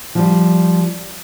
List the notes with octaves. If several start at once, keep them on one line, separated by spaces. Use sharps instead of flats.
F3 G3